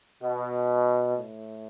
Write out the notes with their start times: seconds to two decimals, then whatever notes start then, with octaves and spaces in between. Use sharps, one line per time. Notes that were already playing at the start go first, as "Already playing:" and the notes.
0.22 B2
1.14 A2